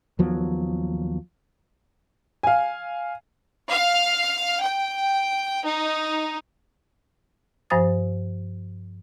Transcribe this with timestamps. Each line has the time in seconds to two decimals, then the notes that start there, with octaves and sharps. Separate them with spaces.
0.19 D#2 F3 F#3 B3
2.43 F5 G#5
3.69 F5
4.61 G5
5.65 D#4
7.70 G2 F3 C5 G#5 D#6 A6